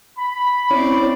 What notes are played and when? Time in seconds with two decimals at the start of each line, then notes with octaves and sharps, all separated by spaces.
0.18 B5
0.71 C4 C#4 E4 C#5 D5